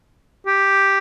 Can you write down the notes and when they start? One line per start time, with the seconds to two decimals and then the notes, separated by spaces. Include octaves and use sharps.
0.47 G4